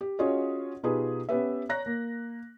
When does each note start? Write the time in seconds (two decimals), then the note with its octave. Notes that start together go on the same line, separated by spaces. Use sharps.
0.01 G4
0.19 C#4 F4 F#4 G#4 C#5 D#5
0.83 B2 D#4 F4 G4 G#4 B4
1.29 B3 C#4 G4 B4 E5
1.69 C#5 A#5 F#6 A#6
1.86 A#3